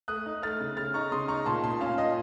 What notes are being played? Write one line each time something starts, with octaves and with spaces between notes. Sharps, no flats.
A3 D#6 F#6
D#4
A3 F6 A6
C#3
C#3 F6 A6
D#4 A#5 C#6
C#3 C6 D#6
D#4 A#5 C#6
A#2 A5 C6
A#2 A5 C6
C#4 F5 A5
A#2 D#5